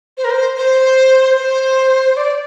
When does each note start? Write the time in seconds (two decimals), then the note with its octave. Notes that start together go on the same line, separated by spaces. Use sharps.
0.18 C5
0.24 A#4
0.31 C5
0.57 C5
1.36 C5
2.17 D5